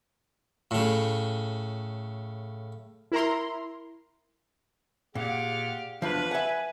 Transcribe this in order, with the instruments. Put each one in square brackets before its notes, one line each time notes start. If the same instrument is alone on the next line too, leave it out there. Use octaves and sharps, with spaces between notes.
[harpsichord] A2 C#3
[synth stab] E4 A#4 A#5 C6
[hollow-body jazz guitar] A#2 [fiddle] G4 F5 [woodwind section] G#4 D5 F#5
[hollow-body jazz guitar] E2 F3 [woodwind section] D4 [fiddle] B4
[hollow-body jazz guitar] E5 F#5 [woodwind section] G#5